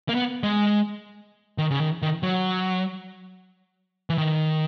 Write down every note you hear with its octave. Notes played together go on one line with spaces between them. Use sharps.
A#3
B3
G#3
D#3
C#3
D#3
D#3
F#3
E3
D#3